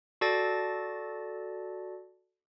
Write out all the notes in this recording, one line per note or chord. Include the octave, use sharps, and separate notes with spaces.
F#4 A4 D5 A5 A6 A#6